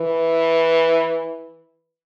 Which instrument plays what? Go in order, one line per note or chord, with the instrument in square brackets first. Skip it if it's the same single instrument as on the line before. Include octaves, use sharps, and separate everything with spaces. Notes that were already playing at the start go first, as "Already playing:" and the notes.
Already playing: [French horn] E3